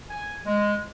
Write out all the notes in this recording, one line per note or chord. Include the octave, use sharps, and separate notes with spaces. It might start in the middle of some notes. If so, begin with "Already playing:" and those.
G#5
G#3